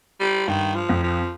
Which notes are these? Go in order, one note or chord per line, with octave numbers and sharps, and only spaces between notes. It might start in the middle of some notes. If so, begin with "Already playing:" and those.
G3
G2 D#3
F3
F2
F3